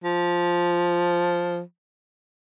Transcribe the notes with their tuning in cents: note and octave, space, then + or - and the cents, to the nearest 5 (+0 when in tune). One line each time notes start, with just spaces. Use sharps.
F3 +0